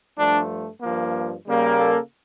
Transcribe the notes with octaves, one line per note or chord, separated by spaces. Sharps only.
G2 F3 A3 D4
G2 F3 A#3
C#3 G3 A#3
A4